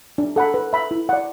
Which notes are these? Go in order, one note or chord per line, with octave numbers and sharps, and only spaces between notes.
D4
A4 F#5 B5
B4
E5 B5
E4
D5 F#5